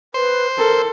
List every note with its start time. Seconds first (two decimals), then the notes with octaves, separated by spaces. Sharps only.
0.14 B4 C5
0.58 A4 A#4